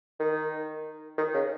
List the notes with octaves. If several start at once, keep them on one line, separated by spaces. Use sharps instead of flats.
D#3
D#3
C#3